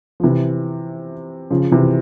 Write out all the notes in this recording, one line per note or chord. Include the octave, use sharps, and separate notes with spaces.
F3
C3 E3
C#3 F3
C3 E3